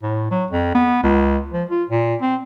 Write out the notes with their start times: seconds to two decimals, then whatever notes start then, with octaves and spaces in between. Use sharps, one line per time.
0.03 A2
0.31 F#3
0.51 F2
0.75 B3
1.03 C#2
1.53 F3
1.69 F4
1.90 A#2
2.21 C4